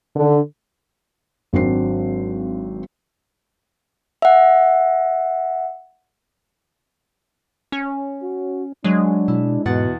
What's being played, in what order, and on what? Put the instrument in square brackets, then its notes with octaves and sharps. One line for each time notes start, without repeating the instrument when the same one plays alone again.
[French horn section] D3
[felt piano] G#1 F#3 C4 D4 C7
[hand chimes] E5 F#5
[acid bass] C#4
[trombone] F#4
[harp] F#3 [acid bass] G#3 [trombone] D4
[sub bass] B2 [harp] E4
[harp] E2 F#5 A6 [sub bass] G#2 [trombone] B2